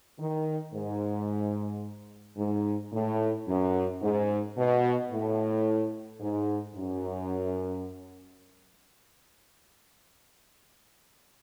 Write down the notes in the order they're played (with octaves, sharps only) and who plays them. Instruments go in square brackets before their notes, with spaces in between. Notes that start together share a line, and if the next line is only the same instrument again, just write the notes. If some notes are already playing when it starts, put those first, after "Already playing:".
[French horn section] D#3
G#2
G#2
A2
F#2
G#2
B2
A2
G#2
F#2